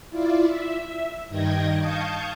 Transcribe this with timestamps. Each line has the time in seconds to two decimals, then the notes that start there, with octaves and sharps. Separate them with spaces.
0.10 E4 F4 D5
0.46 E5
1.29 G2 D#3 D#5 G5 G#6 A#6
1.79 F5 A5 C#6 D#6 G6 G#6